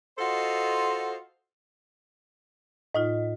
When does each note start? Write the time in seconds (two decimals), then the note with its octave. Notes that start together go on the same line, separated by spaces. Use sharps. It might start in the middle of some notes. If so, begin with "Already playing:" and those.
0.18 F4 F#4 A4 C5 D#5
2.95 A2 D#4 F4 D#5